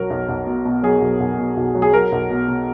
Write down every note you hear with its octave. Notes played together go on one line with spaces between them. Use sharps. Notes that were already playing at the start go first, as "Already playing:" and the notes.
Already playing: B1 F#3 A#4
B1
B1
B2
B2
F#3 G#4
B1
B1
B2
B1
F#3
G#4
F#3 A#4
B1
B2
B2